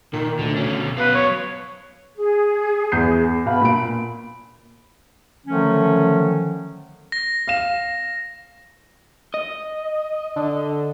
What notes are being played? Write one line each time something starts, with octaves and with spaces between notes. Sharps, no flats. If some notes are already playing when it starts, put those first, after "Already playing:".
A#2 D#3
D2 D3
B2 C#4
F#3 B3 B4 F5
C#5
G#4
E2 G6 C7
B2 F5 B5
A#2 D7
D3 D#3 F3 F#3 A3 C#4
A#6
F5 E7
D#5
D3